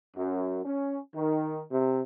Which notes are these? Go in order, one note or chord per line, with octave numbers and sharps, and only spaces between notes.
F#2
C#4
D#3
C3